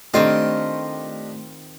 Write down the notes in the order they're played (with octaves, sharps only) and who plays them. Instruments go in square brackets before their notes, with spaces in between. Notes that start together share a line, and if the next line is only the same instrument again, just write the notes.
[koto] D#3 C4 F4 [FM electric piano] A3 [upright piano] D4 G4 [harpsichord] D#5